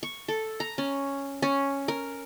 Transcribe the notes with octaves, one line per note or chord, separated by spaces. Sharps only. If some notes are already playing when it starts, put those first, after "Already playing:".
C#6
A4
A#5
C#4
C#4
A#4